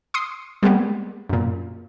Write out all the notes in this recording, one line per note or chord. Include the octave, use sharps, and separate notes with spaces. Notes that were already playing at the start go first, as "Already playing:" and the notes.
C6 D#6 C7
G3 G#3 A#3 B3 G4
F#2 A#2